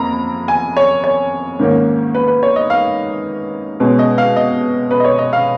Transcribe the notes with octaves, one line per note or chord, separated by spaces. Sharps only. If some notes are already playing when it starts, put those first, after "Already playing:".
Already playing: F2 A#3 A#5 B5
G#5
C#5
C#5
G#2 D#3 A#3 C#4
B4
B4
C#5
D#5
F5
B2 G#3 C#4
D#5
F5
D#5
B4
D#5
C#5
D#5
F5